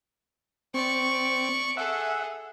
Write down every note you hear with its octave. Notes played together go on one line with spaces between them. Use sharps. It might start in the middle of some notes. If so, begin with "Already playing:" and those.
C4 D5 C#6
G#4 A4 E5 F#5